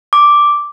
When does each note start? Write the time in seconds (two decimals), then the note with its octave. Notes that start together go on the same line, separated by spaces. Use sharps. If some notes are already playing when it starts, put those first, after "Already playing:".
0.13 D6